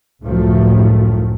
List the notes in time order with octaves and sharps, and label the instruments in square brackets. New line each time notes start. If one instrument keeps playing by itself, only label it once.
[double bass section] C#2 F#2 A2 D#3 F3 A3